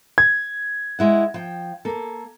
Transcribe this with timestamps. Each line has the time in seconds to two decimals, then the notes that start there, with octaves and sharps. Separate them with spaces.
0.18 G#6
0.99 G#3 E4 F#5
1.34 F3 G5
1.85 A#3 A4